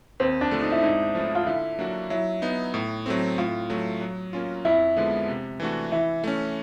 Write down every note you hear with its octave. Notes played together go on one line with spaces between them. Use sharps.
D#2 C4
D4
D3 F3 A3
D#4
E4
G#2 D#4
F3 A3 C#4 E4
F4
D3 E4
F#3 A#3 D4 F#4
F#3 E4
B3 D#4
A2
F#3 A3 C4
A2 F4
F#3 A3
F#3
A#3 C#4 F4
F2 E4
D3 F3 G#3 B3
C3
E3 A3 D4 F#4
E3 E4
A3 C#4 E4